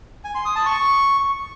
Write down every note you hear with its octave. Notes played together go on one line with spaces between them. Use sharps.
G#5
C6
D#6
A5
C#6